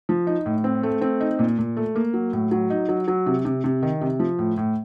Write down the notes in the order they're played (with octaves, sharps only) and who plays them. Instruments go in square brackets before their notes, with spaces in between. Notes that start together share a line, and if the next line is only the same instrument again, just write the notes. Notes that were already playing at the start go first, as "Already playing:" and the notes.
[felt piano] F3
D#4
A2
C4
A3
C4
D#4
A#2
A#2
A3
A#3
F#3
A2
F#3
D#4
F#3
F#3
C3
C3
C3
D#3
C3
F3
A2
A2